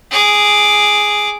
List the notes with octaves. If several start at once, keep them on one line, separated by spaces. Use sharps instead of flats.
G#4 D6